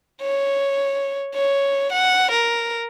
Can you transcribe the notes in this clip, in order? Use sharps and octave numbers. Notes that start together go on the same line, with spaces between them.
C#5
C#5
F#5
A#4